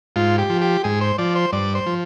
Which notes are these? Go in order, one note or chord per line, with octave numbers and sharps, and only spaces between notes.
G#2 F4
G4
F3
G4
G#2 G#4
C5
F3 D5
C5
G2 D5
C5
F3